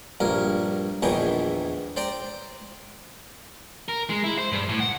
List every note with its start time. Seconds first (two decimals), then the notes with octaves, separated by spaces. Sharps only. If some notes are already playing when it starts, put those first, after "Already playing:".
0.20 A#1 G2 A#4
1.02 A#1 E2 D#3 E3 G5 A#5
1.96 C5 D5 G5 A#5
3.88 A#4
4.10 G#3
4.24 E4
4.39 C5
4.52 G2
4.69 A2
4.80 F#5